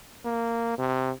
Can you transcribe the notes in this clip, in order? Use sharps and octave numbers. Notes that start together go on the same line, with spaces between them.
A#3
C3